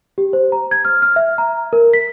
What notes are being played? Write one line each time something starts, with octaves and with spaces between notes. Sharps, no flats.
G4
C5
A#5
G#6
F6
F6
E5
A#5
A#4
B6